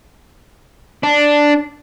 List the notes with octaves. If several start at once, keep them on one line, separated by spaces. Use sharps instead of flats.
D4